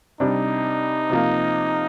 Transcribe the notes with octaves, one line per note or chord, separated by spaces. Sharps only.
C3 G3 D4 D#4
C3 F3 A#3